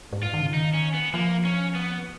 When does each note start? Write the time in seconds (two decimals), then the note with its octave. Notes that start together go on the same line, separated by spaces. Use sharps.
0.13 G#2
0.23 F4
0.34 D#3
0.41 C#3
0.48 D#3
0.54 D#4
0.74 C#4
0.94 B3
1.14 F3 A#3
1.45 C#4
1.75 B3